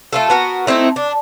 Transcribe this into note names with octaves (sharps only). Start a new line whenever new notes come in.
A3 F4 A4
B3 F#4 A#4
A3 C4 D#4 E4
D4